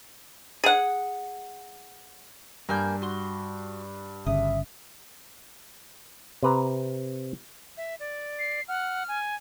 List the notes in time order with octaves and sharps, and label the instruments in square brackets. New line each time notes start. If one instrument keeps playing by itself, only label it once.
[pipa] G#4 F#5
[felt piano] G2 [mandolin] A#3 G#5 G6
[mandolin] F#4 C6
[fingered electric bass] G1 C#3 [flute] E5 [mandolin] D#6
[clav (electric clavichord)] C3 B4 A#5
[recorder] E5
D5
[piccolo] C7
[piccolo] F#5 [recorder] F6
[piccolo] G#5